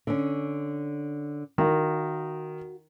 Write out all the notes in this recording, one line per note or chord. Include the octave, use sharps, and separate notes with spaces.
D3 C#4
D#3 F#4 F5